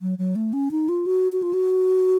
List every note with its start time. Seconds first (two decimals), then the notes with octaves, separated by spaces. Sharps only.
0.02 F#3
0.18 F#3
0.36 A3
0.53 C#4
0.71 D#4
0.89 F4
1.06 F#4
1.32 F#4
1.43 F4
1.53 F#4